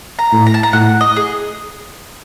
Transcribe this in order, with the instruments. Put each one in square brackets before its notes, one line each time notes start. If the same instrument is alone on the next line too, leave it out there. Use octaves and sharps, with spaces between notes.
[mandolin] A#5
[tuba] A2
[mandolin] A#5
A5
A#5
[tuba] A2 [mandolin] F#5
[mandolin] D#5
G#4